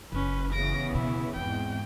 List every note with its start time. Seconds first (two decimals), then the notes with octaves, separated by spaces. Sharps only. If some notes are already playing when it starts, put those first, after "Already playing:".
0.12 F#1 C#4 B4
0.53 C#3 E3 B3 A#6 D7
0.92 D2 B2 E4
1.36 E2 G#2 C4 G5